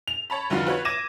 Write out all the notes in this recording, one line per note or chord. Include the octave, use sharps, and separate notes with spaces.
F7
C#5 A5 B5
F1 D3 F#3 F4 F#4 F5
F4 F#4 B4 C#5
D6 G#6 A#6 D#7 E7